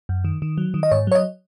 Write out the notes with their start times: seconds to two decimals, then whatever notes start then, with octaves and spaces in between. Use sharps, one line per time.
0.09 F#2
0.25 D#3
0.42 D#3
0.58 F#3
0.74 D#3
0.83 D#5
0.91 G#2 C#5
1.07 F#3 C#5
1.15 D#5